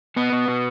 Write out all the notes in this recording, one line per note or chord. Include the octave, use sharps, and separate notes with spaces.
B2 B3
B2
B2